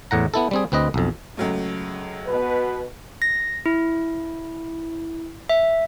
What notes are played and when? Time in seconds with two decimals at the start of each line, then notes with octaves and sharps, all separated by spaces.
0.11 E2 A2 F#5 A#5
0.34 B3 E4 A4
0.51 G3 C4 G#4
0.72 D2 C4 B4 D#5
0.94 B1 F2
1.37 C#2 F#3 A3
2.27 B2 B4
3.22 A#6
3.66 E4
5.49 E5